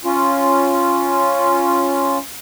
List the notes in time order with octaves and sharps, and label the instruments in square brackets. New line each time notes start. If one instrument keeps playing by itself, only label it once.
[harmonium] C#4 F4